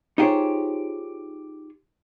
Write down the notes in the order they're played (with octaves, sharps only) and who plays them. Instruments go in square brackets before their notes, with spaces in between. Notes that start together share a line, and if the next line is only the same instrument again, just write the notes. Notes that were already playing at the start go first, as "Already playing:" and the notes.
[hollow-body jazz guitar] D#4 F4 G4 G#4 C5 C#5